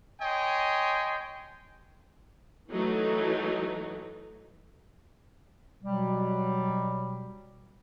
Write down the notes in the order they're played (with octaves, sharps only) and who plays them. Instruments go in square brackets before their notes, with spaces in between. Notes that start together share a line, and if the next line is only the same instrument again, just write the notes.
[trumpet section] C#5 D#5 G5 G#5 C6
[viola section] E3 F#3 A3 D#4
[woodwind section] B2 F#3 G3